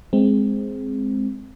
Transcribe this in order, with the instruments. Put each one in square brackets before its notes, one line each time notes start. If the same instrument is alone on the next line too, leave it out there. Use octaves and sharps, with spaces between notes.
[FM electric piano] G#3 C4